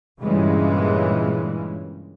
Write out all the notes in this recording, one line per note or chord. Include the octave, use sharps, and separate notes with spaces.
G2 A#2 C#3 E3 G3 G#3